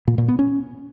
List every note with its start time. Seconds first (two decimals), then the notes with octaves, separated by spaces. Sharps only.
0.08 A#2
0.18 A#2
0.28 B3
0.39 C#4